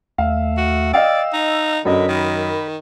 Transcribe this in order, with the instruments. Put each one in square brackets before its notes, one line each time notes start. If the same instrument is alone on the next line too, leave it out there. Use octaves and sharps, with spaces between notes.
[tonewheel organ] D#2 A3 E5 [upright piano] F5
[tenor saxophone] F#4
[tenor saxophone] D5 [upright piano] D#5 F5 G5 [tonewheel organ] E6
[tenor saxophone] D#4
[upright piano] F#2 D#5 [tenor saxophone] D3 [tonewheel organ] A#4 B5
[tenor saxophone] D#3